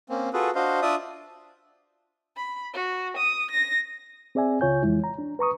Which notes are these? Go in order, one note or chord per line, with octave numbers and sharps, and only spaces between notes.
A#3 C4 C#4
F4 F#4 G#4 A4 B4
D4 F#4 C5 D#5 F5
D4 F4 D5 E5 D#6
B5
F#4
D#6
A#6
C4 G#4 D5 E5 G#5
C#2 C#3 F4 C#5 G#5 G6
F2 E3 G#3 E4
A#5
D4
B4 A#5 C#6 D#6